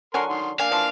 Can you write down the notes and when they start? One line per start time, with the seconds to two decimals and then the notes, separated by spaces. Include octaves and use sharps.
0.14 D3 F#3 A#4 G#5 C6
0.29 D#3 C6
0.59 A#3 D4 F5 G#5
0.71 E3 F3